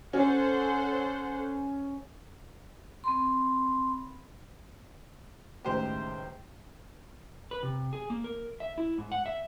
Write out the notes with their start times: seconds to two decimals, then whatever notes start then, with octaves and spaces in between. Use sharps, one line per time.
0.13 C#4 A4 C5 F#5
3.04 C4 B5 C6
5.65 C#2 A2 D#3 G4 C5
7.51 B4
7.63 C3
7.93 G#4
8.10 A#3
8.24 A#4
8.60 E5
8.78 E4
8.98 G#2
9.12 F#5
9.26 E5